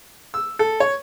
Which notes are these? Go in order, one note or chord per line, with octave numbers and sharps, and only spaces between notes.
E6
A4
C#5